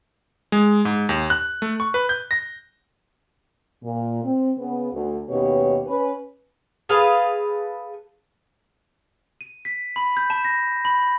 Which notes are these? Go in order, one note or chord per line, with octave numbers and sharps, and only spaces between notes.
G#3
G#2
D#2
F#6
A3
C#6
B4
G6
A#6
A#2
C4
C#3 B3
D2
D#2 B2 C#4 G4 B4 C#5
C#4 B4
G#4 A4 B4 F5
D#7
B6
B5
G6
A5
A#6
B5